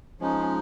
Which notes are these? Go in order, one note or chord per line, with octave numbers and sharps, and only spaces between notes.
F3 G#3 C#4 D#4